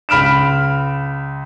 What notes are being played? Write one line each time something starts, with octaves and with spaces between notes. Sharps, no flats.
C#2 B5 F6 D7 E7